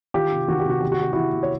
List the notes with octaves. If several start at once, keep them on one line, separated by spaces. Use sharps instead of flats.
D#3 F4 G4
C3
D#3 F#4
G4
C3 F#4
D#3 G4
F#4
C3 G4
D#3 E4 F#4
C3
C#5